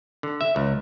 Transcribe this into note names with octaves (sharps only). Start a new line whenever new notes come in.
D3
E5
C#2